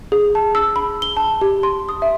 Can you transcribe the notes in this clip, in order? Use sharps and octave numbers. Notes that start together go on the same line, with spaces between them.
G#4
A5
E6
B5
G7
A5
G4
C6
D#6
E5